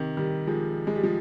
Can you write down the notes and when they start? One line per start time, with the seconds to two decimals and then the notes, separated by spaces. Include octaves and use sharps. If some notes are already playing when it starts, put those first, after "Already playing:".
Already playing: C3 D#3
0.17 D#3 G3
0.47 F3 G#3
0.87 G#3
0.95 G3
1.03 F3 G#3